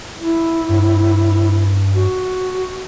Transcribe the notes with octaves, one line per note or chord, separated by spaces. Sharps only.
E4
G2
F#4